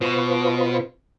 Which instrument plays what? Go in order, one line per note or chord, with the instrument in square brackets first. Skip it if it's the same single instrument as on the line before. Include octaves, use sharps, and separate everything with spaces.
[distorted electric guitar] B2 [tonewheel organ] F4 B4 C5